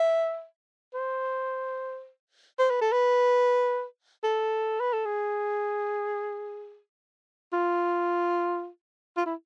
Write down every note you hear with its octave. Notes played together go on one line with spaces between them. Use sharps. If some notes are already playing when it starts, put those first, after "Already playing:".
Already playing: E5
C5
C5
B4
A4
B4
A4
B4
A4
G#4
F4
F4
E4